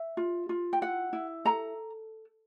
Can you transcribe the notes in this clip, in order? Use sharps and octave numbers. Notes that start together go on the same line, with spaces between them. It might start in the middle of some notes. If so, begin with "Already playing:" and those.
Already playing: E5
F4
F4
G5
E4 F#5
E4
A4 A#5